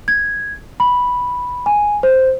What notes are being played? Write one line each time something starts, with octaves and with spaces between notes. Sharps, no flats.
G#6
B5
G#5
C5